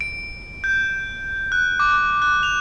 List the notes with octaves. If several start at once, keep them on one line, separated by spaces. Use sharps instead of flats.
D7
G6
F#6
D6
F#6
F7